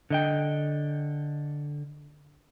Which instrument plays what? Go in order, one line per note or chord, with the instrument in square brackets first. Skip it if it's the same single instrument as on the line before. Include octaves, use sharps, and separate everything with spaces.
[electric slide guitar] D3 D#5 G5